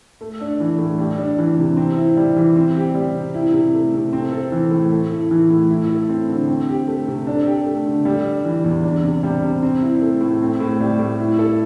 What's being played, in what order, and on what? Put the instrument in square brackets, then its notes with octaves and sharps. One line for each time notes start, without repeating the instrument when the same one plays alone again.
[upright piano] A3
D4
E3
A2
G3
D4
E3
C3
C4
E4
G3
E3
C4
G4
G3
C3
E4
C3
A3
C3
C4
A4
E3
A2
A3
E4
E3
A2
E4
A4
C4
D3
C4
G4
A3
C3
D4
G4
A3
D3
G3
D4
E3
E2
D4
C3
G3
C3
C4
E4
A3
A2
C4
A2
G3
A2
E4
A4